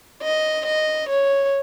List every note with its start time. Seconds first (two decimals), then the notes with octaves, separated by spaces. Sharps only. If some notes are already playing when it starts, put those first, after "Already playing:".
0.23 D#5
0.66 D#5
1.10 C#5